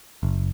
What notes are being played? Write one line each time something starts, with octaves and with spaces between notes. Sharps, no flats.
F#1